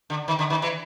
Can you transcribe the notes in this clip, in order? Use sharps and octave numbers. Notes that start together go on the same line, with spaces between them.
D3
D#3
D3
D#3
E3